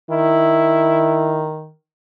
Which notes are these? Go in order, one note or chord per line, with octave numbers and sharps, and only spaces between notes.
D#3 E4